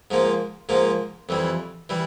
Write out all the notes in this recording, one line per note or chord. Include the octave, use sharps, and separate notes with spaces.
G#2 F3 A#3
G#2 F3 A#3
F2 E3 G3
E3 G3